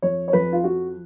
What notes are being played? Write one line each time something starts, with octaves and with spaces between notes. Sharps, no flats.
F2 C#5
C#5
F2 B4
F4
F3 F#4